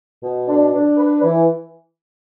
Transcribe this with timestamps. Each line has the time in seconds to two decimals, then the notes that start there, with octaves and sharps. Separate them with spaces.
0.23 B2
0.48 D4
0.72 D4
0.97 B4
1.22 E3